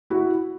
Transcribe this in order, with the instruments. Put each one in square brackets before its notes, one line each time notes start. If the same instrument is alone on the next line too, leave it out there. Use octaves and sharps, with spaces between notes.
[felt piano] E4 F#4